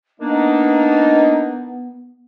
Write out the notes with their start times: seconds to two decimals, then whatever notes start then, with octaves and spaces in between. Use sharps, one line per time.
0.20 A#3 B3 D4 D#4